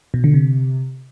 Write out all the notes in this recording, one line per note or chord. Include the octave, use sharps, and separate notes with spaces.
B2
D3
C3